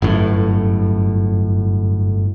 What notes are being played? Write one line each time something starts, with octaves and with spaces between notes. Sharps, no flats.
G1 F#2 A2